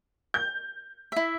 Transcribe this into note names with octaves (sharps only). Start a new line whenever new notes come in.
G6
E4 E5